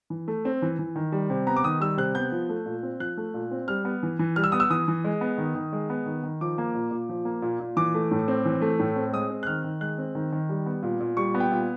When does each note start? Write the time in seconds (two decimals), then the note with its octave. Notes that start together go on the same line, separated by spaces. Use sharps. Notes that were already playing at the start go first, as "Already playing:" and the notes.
0.10 E3
0.28 A3
0.45 C4
0.62 E3
0.79 E3
0.96 D#3
1.12 G3
1.30 C3
1.47 B3 A#5
1.57 D6
1.64 D#3 D#6
1.80 G3 E6
1.97 C3 F#6
2.15 B3 G6
2.32 F3
2.49 A3
2.66 A#2
2.83 C4
3.00 F3 F#6
3.17 A3
3.34 A#2
3.51 C4
3.68 G3 F6
3.85 B3
4.03 E3
4.19 E3
4.36 G3 F6
4.44 E6
4.52 B3 D#6
4.60 E6
4.70 E3 D#6
4.88 E3
5.04 G#3
5.21 B3
5.38 D#3
5.55 D#3
5.73 G#3
5.90 B3
6.06 D#3
6.23 D#3
6.41 F3 D6
6.58 A#3
6.74 A#2
6.91 A#2
7.09 F3
7.25 A#3
7.42 A#2
7.60 A#2
7.77 E3 D6
7.94 A3
8.11 A2
8.28 C4
8.45 E3
8.61 A3
8.79 A2
8.96 C4
9.13 G#3 D#6
9.30 C4
9.43 F#6
9.47 D#3 F6
9.64 D#3
9.81 G#3 F#6
9.98 C4
10.15 D#3
10.32 D#3
10.49 G3
10.66 B3
10.83 A#2
11.00 A#2
11.17 G3 C#6
11.34 B3
11.40 G5
11.52 A#2